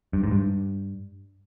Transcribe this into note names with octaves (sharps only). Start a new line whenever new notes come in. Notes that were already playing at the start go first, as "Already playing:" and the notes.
G2
G#2
G2